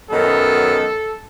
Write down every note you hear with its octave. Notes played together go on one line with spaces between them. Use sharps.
F#2 D#3 F#3 B3 A4